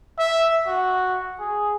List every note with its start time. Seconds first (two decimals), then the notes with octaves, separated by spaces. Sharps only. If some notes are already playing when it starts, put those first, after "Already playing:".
0.19 E5
0.67 F#4
1.40 G#4